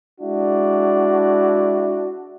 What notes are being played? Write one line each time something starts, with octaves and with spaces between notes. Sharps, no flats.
G#3 D4 E4 F#4